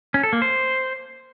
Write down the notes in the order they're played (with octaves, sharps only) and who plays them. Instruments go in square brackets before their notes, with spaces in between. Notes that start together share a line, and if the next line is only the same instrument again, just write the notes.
[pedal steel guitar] C#4
A4
A#3
C5